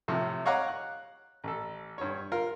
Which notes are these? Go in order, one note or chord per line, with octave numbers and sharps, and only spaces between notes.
A2 C3 F3
C#5 D#5 F5 F#5 A#5 D6
F#6
A1 A4
G2 C#5
F4 A#4